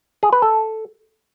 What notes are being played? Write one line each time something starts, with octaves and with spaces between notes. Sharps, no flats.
G#4
B4
A4